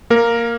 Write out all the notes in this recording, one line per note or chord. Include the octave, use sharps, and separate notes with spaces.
A#3 A#4